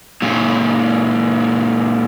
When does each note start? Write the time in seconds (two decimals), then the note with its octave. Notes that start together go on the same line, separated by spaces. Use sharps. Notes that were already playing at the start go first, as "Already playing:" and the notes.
0.22 F#2 A#2